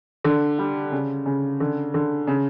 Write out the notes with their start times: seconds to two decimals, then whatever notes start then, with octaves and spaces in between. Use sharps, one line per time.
0.24 D3
0.58 G3
0.92 C#3
1.26 C#3
1.60 D3
1.94 D3
2.27 C#3